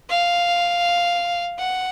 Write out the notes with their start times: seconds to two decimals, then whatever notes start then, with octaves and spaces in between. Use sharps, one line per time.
0.09 F5
1.59 F#5